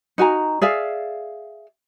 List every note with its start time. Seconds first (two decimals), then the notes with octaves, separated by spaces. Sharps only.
0.18 D#4 F#4 G#5 A#5
0.62 G#4 D5 E5 F5